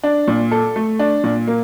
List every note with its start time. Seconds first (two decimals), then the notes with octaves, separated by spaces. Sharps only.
0.03 D4
0.28 A#2
0.51 A4
0.76 A3
0.99 D4
1.24 A#2
1.48 A#3